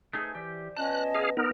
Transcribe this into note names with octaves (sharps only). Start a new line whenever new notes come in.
A3 D#4 G#4 C5 G#5
E3 G4 D5
F3 B3 C#4 D#5 A5 F#6
G#4 B4 C#5 F5
B3 D#4 A#4